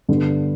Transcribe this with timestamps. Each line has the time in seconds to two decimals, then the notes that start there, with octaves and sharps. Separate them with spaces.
0.09 G2 D3 G3 B3